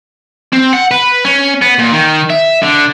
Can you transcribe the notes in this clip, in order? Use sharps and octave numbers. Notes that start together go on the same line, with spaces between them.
C4
F#5
B4
C#4
B3
A#2
D#3
E5
D3